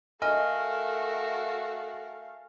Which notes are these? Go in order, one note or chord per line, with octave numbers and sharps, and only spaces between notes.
A3 F#4 A#4 D#5 F5 G#5 F6